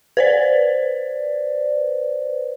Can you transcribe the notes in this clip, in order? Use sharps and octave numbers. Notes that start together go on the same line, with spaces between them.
B4 C5 D5